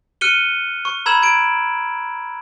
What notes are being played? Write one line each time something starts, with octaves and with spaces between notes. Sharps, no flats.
F6 F#6 C#7 D#7 G7
C#6
A#5 B5 E6 G#6 E7 F#7
G#6 D7